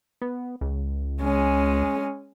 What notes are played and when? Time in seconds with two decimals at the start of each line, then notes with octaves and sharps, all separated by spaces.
0.22 B3
0.61 C#2
1.22 G#3 C#4